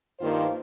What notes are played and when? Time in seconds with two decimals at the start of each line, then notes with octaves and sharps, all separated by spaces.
0.19 G2 D#3 A#3 F4 C5